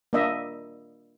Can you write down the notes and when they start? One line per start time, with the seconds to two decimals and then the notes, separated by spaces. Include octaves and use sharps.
0.13 A#3 D4 D#5 E5